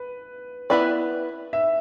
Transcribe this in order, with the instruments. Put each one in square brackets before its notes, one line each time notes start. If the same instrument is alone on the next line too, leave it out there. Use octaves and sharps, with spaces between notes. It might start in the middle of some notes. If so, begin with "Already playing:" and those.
Already playing: [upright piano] B4
[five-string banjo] B3 E4 B4 D5
[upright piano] E5